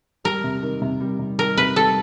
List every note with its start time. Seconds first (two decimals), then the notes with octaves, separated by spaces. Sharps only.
0.24 G3 A#4
0.44 C3
0.62 D#3
0.82 C3
1.00 G3
1.19 C3
1.39 D#3 A#4
1.57 C3 B4
1.76 G3 A4